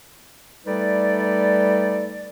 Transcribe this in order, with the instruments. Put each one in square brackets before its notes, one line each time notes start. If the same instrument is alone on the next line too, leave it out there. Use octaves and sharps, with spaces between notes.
[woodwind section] G3 A3 D#4 A4 B4 D5